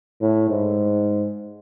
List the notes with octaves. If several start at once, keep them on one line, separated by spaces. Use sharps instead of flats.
A2
G#2